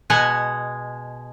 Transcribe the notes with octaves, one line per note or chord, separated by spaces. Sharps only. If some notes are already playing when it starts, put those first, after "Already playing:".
B2 G#3 F#5 G#5